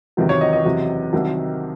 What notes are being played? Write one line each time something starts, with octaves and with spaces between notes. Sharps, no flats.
E2 C3 D#3 F#3
C#5
D#5
D#5
F#1 E2 C3 F#3
C2 C3 D#3 F#3